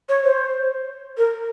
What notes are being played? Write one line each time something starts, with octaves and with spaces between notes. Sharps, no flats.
C#5
C5
A#4